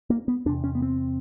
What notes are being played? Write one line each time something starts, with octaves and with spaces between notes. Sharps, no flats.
A#3
B3
E2 C3 D4
C#4
B3
C4